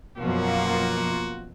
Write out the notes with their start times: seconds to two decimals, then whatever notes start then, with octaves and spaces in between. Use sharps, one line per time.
0.18 F#2 B2 F3 A#3 F4 F#4